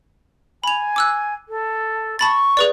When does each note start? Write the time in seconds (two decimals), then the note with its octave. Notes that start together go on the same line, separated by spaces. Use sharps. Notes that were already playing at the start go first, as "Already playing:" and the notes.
0.64 G#5 B5 F7
0.96 D6 E6 F#6
1.48 A4
2.19 A5 B5 C#6 A6
2.57 G#4 B4 D5